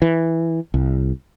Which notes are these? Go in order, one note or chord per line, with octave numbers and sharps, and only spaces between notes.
E3
C2